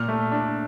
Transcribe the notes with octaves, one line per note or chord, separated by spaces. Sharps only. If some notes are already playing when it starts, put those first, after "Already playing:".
Already playing: A#2 F6
A3
D4